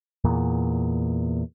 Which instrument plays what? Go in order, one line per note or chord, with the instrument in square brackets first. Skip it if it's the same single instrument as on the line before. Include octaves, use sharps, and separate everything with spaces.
[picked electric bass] E2 A#2